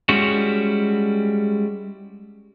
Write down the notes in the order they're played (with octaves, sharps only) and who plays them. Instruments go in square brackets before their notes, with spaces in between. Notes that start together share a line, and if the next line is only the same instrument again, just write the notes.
[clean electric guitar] G3 G#3 C#4 E4 F#4